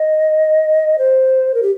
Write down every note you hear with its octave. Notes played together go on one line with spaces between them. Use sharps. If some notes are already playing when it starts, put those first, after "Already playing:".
Already playing: D#5
C5
A#4
G4